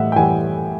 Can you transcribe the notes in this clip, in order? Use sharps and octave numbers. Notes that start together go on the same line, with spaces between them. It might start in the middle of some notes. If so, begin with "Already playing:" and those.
Already playing: A2 E3 G3 D#5 E5 F#5
G5
E3 G3 F#5 G#5